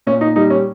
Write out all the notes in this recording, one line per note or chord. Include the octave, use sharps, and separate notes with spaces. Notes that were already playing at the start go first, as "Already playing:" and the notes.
A#2 C#4
D#4
G3 D#4
C#4